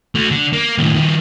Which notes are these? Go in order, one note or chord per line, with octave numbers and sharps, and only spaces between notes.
A3 F#4
D3
A#3
D#2 A2
D#3 F3